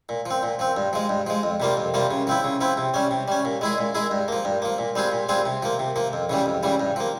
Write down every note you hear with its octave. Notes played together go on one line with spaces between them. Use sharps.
A#2
F3 C4
A#2
F3 C4
G2
F3 G#3
G2
F3 G#3
F2
C3 G3 A#3 F4
F2
C3 G3 A#3 F4
C#3
F3 C4 E4
C#3
F3 C4 E4
C3
G3 C#4
C3
G3 C#4
A#2
G#3 E4 G#4
A#2
G#3 E4 G#4
G2
F3 A#3
G2
F3 A#3
A#2
G3 C4 F4 G#4
A#2
G3 C4 F4 G#4
C3
F3 A#3
C3
F3 A#3
F2
C#3 E3 G3
F2
C#3 E3 G3
G2
F3 A#3